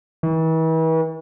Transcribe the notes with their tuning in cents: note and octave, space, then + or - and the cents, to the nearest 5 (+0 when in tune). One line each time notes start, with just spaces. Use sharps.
E3 -40